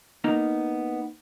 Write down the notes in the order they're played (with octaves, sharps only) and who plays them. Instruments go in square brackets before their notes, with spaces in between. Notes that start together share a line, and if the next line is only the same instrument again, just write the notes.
[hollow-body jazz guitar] A#3 B3 D#4